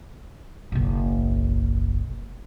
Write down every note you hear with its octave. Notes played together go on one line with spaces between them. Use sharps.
F#1 B1